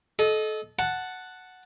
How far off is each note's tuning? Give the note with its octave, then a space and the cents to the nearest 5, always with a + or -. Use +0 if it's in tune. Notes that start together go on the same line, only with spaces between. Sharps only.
A4 -30 D#5 +0
F#5 +0 A5 +0